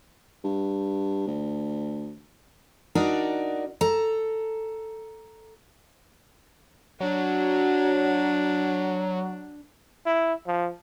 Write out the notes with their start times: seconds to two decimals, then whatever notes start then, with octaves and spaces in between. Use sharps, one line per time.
0.44 G2
1.27 D2
2.95 D4 D#4 F#4 A#4 D5
3.81 A4 A#5
7.00 F#3 D4
10.06 E4
10.47 F3